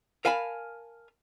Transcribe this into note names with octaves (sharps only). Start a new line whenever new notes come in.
A#4 F5 G#5 A5 B5